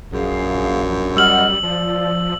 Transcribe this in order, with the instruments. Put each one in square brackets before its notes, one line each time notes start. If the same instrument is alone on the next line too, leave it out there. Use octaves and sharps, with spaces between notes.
[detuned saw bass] A#1 [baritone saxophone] F#2 [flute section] G#4 F5
[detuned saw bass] G3 [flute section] D#5 F#5 F6 [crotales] E6 F#7
[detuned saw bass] F3 [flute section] D5